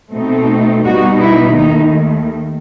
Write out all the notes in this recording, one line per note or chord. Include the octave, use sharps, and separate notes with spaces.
B2 A3 C4 D#4
B2 G3 B3 D#4 F#4
E4
D#2 D#3 A3 D#4